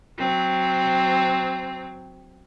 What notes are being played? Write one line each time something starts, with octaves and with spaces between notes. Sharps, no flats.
F#3 C4